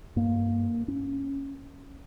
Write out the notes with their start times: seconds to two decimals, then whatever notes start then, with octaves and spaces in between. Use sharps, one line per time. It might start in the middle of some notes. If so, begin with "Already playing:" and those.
0.16 G2 A#3
0.88 C#4